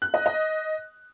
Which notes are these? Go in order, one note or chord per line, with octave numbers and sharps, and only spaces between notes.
F#6
D#5
D#5